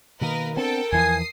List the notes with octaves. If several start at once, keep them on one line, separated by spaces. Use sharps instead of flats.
B2 D#3 A#3 A#4 B4 D#5
B3 C4 D4 A4 A#4 G5 A5
E2 E3 F3 G#5 D#6 C7